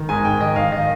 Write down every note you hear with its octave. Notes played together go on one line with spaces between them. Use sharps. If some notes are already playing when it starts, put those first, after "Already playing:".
Already playing: D#3
G#2 G#5
G#2 G5
D#3 D#5
D#3 F5
D#3 D#5